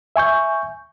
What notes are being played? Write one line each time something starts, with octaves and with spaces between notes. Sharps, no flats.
E5 G#5 C#6 G6